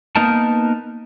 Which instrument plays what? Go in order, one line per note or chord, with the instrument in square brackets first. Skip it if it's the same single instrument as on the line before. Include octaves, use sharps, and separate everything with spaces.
[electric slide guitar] A#3 B3 D#4 A#4 A5